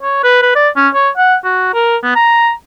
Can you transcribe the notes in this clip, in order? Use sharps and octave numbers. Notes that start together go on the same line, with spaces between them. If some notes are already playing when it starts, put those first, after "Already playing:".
C#5
B4
B4
D5
C#4
C#5
F#5
F#4
A#4
B3
A#5